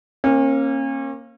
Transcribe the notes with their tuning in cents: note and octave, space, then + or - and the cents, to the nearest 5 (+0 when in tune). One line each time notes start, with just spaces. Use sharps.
A#3 +0 C#4 -35